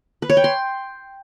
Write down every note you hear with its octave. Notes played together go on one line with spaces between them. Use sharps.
B4
C#5
G5
C6